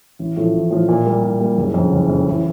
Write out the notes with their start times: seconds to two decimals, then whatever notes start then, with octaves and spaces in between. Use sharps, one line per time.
0.19 A1
0.37 A2 F3 A3
0.53 A1
0.70 A2 F3 A3
0.88 A#2
1.05 G3 A#3
1.23 A#2
1.40 G3 A#3
1.57 F#1
1.74 F2 C#3
1.92 F#1
2.09 F2 C#3
2.26 A1